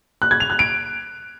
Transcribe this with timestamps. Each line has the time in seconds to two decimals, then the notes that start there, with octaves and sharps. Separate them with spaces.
0.22 F#6
0.31 G#6
0.40 F7
0.50 F#6
0.59 D7